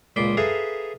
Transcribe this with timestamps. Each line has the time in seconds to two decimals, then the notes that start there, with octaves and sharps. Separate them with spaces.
0.16 C#2 A#2 B5 C6 D6
0.37 G#4 A4 B4 E5 F5 A#5